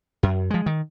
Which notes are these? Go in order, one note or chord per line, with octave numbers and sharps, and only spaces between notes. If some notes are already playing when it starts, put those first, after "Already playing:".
F#2
F3 G#3
D#3